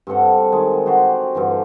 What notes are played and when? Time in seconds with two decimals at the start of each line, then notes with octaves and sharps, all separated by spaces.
0.07 G2 C4 A4 F#5
0.52 D#3 G#3
0.86 F#4 G4 C5 D5
1.35 G2 D3 E3